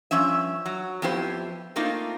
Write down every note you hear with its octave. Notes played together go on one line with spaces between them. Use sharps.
G2 F3 C#4 E5
F#3
F2 B3 E4 G4 C5
A3 A#3 C4 D#4 F4